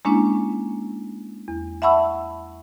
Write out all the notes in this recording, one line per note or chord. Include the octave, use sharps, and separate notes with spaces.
G#3 A#3 C#4 D4 E4
E2
E5 F#5 A5 B5 C#6 E6